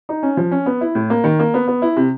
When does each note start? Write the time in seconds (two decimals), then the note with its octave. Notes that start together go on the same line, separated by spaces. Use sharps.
0.09 D#4
0.23 C#4
0.37 F3
0.51 C#4
0.66 B3
0.81 E4
0.95 A2
1.10 A#3
1.24 D#3
1.39 A#3
1.54 B3
1.68 B3
1.82 E4
1.96 C3